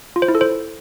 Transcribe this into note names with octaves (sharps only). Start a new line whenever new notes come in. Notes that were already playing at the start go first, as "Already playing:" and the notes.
F4
C5
E4
A4
C5